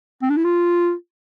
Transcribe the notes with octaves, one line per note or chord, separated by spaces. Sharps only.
C4
D4
E4
F4